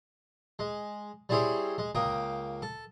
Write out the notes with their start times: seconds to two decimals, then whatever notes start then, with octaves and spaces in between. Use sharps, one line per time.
0.59 G#3
1.29 G3 C4 E4 G#4 C5 C#5
1.78 G#3
1.95 C#2 A#3 G5 D#6
2.62 A4